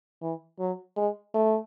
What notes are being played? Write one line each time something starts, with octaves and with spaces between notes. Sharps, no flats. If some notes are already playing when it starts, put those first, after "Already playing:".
E3
F#3
G#3
A3